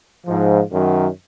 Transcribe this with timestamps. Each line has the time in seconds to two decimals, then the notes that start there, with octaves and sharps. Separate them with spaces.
0.25 G#2 F3
0.70 F#2 D#3 F#3